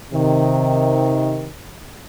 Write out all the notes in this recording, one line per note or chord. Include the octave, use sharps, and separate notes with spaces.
C3 D#3